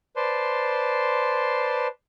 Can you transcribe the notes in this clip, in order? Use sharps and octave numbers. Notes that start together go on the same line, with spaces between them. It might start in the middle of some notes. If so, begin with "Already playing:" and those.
B4 C5 D5 A5 C6